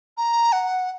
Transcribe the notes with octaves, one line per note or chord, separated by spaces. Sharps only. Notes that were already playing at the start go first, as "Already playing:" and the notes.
A#5
F#5